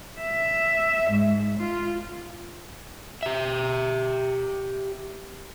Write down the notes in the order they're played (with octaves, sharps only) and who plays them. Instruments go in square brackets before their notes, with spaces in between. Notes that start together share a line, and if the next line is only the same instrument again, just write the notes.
[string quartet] E5
G#2
F4
[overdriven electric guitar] G4 E5